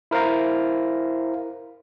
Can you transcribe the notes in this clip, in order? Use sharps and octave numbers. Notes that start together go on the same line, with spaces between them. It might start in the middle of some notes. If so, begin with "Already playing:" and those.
E4 A#4 C5 F5 A#5